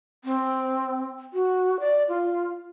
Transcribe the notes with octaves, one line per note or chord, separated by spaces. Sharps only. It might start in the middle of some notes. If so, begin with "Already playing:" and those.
C4
F#4
D5
F4